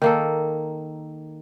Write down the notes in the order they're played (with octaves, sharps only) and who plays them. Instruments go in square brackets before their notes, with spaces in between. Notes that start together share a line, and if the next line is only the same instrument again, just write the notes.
[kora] D#3 A#3 A4